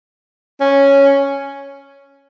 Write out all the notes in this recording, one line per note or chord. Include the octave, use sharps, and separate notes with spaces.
C#4